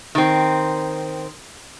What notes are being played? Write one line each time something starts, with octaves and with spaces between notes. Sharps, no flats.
D#3 C4